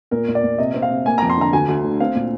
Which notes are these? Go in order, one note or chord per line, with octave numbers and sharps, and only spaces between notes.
A#2 A#4
A#2
D5
A#2
C3 D#5
C4
F5
C3
A#3 G#5
F2 A#5
C6
D3 A#5
D2 G#5
D2
D3
C4 F5
A#2